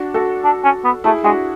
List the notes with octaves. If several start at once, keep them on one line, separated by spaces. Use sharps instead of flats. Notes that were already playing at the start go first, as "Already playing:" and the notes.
Already playing: D4 F#4
F#4 A4
D4
C#4
B3
A3 E4 G#4
G#3 D4 F#4